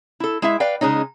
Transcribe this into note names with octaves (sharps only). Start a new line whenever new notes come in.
E4 A4
G#3 E4 E5
B4 D5 F5 G5
C#3 G#3 C#4 D#4